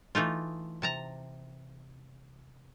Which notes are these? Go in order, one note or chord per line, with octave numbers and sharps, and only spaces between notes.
E3 A3 D#4 F4
C3 A5 A#5